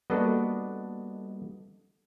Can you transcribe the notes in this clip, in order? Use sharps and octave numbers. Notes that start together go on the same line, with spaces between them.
G3 A#3 B3 D4 F#4 A4 D#5